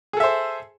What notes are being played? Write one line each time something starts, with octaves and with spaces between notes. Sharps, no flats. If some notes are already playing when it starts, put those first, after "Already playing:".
G#4 A4 C5 E5